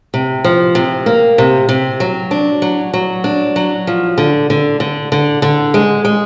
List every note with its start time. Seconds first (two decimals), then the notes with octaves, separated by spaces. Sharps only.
0.14 C3
0.44 F3
0.75 C3
1.06 A#3
1.38 C3
1.69 C3
2.00 F#3
2.31 D4
2.62 F#3
2.94 F#3
3.24 D4
3.56 F#3
3.87 F3
4.18 D3
4.50 D3
4.80 D3
5.12 D3
5.42 D3
5.74 G#3
6.05 G#3